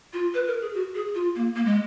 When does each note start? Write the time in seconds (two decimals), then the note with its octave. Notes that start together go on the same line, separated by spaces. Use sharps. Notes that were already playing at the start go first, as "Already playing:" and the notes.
0.13 F4
0.34 B4
0.48 A#4
0.61 G#4
0.75 F#4
0.95 G#4
1.15 F4
1.36 A#3
1.56 A#3
1.66 G#3